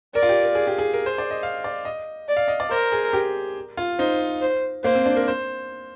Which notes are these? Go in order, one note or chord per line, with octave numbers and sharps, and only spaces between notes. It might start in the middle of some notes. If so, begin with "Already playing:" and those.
A#4 D5
F4
G4
A#4
G#4
G4
G#4
A#4
C5
D5
D#5
F5
D5
D#5
D5
F5
D#5
D5
A#4 C5
G#4
G4
F4
D#4 C5
C5
A#3 C5
C4
D4
A#4
C5